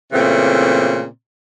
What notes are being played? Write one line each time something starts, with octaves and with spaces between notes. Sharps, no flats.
A#2 C#3 E3 A3 C4